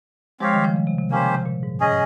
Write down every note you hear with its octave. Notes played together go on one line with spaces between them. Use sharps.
F3 G#3 C4 G4 C#5 F5
D#3 G3
C#3 F3
C#3
C3
C3
C#3 A#3 C#4 G4 C5
C#3 F3
C3
A#2
G#2
G2 C#4 G#4 D#5